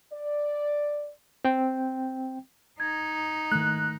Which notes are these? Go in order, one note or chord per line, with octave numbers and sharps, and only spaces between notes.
D5
C4 G5
D#4 G#6
D#3 A3 F#6